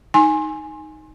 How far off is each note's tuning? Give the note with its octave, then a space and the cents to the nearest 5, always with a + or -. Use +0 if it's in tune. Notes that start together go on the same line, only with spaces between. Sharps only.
D#4 +0 G#5 +0 C6 +30